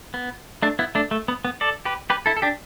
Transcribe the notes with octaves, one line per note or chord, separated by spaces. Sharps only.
B3
A3 D4
B3 E4
A3 D4
A3
B3
B3
A4 D5
G4 B4
G4 B4
E4 A4
A4
D4 G4